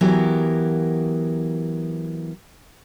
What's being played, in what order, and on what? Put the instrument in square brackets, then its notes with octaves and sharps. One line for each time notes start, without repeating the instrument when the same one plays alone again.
[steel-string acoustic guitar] E3 F#3 B3 G4 A#4